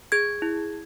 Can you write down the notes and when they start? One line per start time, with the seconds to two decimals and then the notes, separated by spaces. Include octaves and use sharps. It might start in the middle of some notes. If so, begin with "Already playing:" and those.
0.12 G#4 G#6
0.42 E4